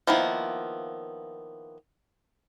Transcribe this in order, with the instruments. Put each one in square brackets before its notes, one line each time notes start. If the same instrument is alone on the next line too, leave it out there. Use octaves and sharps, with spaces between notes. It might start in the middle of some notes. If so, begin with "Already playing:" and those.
[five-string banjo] D#3 F3 A#3 B3 E4